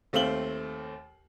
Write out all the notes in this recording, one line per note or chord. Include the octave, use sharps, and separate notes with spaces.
D#2 A3 C4 F5 F#7 G7